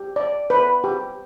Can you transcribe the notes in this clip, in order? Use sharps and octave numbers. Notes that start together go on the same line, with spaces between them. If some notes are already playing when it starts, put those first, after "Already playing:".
Already playing: G4
D5
B4
G4